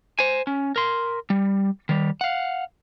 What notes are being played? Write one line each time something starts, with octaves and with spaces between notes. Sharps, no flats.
C5 G#5
C#4
A#4 C6
G3
D#3 G3
F5 F#5